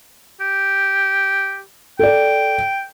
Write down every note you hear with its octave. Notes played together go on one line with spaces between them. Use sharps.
G4
A4 D5 G5